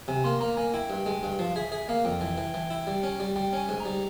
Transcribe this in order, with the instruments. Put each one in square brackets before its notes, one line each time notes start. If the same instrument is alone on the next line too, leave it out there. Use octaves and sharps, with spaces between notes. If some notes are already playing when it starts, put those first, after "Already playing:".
[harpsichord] C3 [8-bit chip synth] G#5
[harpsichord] A#3 [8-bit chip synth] C6
[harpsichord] A#3 [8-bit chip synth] A#5
[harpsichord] A#3 [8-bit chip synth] G#5
[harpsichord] E4 [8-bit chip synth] G5
[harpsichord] G2
G#3
G2
[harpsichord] F3 [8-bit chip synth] F5
[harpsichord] G#4 [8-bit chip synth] E5
[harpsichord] G#4 [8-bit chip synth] E5
[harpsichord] A#3 [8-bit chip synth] F5
[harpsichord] F2 [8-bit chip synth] G5
[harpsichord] E3
E3
E3
E4
G3
C#4
G3
[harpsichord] G3 [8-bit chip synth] G5
[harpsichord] C#4 [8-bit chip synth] G#5
[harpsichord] G#2
[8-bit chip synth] A#5
[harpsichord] G3